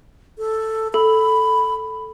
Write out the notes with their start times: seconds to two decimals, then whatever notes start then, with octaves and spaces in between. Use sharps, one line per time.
0.39 A4
0.94 A4 B5